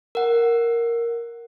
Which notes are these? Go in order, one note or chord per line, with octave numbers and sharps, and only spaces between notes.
A#4 F#5